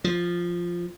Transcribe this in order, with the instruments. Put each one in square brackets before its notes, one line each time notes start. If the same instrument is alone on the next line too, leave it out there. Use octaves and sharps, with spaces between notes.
[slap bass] F3